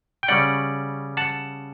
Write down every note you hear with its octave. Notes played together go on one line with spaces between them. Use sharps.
G5
C#3 G3 C#4 D5 F#5
F#5 A5